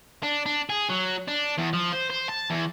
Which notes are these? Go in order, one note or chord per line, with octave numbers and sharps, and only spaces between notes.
D4
D4
G#4
F#3
D4
E2
F3
C5
C5
A5
E2